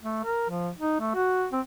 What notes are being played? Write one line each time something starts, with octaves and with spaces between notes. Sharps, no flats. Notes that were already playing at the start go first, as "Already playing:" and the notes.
A3
A#4
F3
D#4
A3
F#4
C4